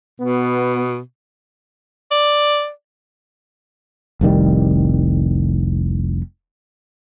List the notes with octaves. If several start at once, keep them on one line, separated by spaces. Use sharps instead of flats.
B2 B3
D5
F1 C2 D#3 G3